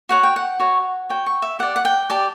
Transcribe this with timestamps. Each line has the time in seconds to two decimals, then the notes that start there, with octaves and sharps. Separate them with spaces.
0.09 F#4 C#5 F#5
0.23 G5
0.36 F#5
0.60 F#4 C#5
1.09 F#4 C#5 G5
1.26 C#6
1.42 E5
1.59 G4 D5 F#5
1.76 F#5
1.85 G5
2.10 G4 D5 A5